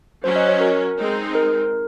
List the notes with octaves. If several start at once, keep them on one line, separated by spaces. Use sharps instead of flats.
F#3 C#4 F#4 C5
D#5
C#5
A#4
G#3 C4 D#4
A#4